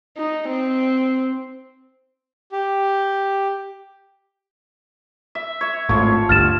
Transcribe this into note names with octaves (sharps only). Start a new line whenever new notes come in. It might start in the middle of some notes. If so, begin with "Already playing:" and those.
D#4
C4
G4
E5
C#5 E5
G#1 A2 F3 C#5
G1 D2 G2 F6 A6 E7